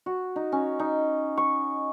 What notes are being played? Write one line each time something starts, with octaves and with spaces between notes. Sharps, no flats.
F#4
D#4
C#4
D#4
C#6